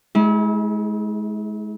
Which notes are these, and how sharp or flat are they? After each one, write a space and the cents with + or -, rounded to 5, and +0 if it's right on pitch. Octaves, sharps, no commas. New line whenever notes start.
G#3 +35 E4 -40 G#4 -20